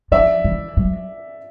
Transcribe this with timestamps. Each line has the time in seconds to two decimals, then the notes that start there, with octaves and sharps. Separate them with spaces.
0.11 F3 D5 E5
0.44 E3
0.77 F#3